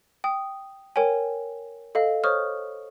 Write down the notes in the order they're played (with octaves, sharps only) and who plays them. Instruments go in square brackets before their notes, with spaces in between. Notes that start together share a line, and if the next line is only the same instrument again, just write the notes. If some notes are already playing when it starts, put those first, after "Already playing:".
[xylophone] G5 D#6
A#4 C#5 G5 G#5
A4 D#5 F5
C5 C#5 C#6 D#6 F6